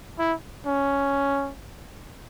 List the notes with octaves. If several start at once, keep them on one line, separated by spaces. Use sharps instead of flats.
E4
C#4